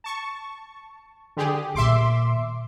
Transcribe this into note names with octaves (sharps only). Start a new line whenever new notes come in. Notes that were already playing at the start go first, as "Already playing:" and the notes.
A5 C#6
D3 G4 G#4
A#2 D#3 E5 C6 D6